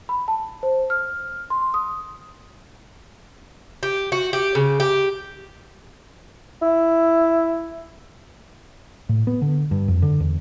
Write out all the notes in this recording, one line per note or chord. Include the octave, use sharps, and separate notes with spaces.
B5
A5
C5
F6
C6
D#6
G4
F#4
G4
C#3
G4
E4
A2
B3
D3
G2
F2
D3
E2